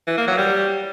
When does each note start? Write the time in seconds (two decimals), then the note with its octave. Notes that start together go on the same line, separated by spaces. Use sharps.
0.07 E3
0.17 A#3
0.27 F#3
0.38 G3